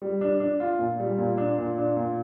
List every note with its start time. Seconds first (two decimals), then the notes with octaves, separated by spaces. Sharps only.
0.02 G3
0.21 D4
0.40 D4
0.60 F4
0.79 A#2
1.00 G3
1.18 A#2
1.38 D4
1.58 A#2
1.78 D4
1.96 A#2